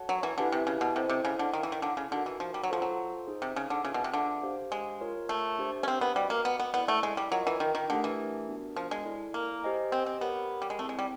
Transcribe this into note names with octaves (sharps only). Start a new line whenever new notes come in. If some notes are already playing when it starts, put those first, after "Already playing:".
Already playing: F#4 A4 C#5 F#5 A5
F#3
E3
D3 E4 G4 B4 E5 G#5
C3
C#3
B2
C3 E4 A4 C5 D#5 G5
C3
C#3
D3
D#3 E4 A4 C#5 F5
E3
D#3
D3
C#3
D3 D#4 F#4 A#4
E3
F3
G3
F#3
F3 F4 A4 C5
F#3
D#4 G#4 C5
C3
C#3
D3
C#3 F4 G#4 B4 E5
B2
C3
D3
D4 G4 C5 F5
G#3
F4 A#4 C#5
A3
D4 G4 C5 E5
C#4
C4
B3
G3 F#4 B4 D#5 G5
A#3
B3
B3
B3 E4 A4 D5 F#5
A3
G#3
G3
F#3 F4 A#4 D#5
E3
D#3
D#3
D3 A3 D4 G4 A#4
E3
B3 D4 F#4 A#4
F3
G#3
E4 A4 D5
A#3
G4 C5 D#5 G#5
C4
C4
B3 G4 A#4 C#5
G3
G#3
A3 C4 E4 G#4
G#3
G3